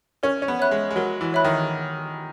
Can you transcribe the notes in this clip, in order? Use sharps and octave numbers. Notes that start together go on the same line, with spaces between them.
C#4 A#4
C#4
B3
C#5 E5 B5 F#6
G#3
G#3
F#3 A#4
E3
C#5 E5 B5 F#6
D#3